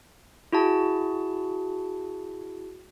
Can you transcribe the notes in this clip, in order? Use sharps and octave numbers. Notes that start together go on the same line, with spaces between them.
E4 F#4 G#4 A5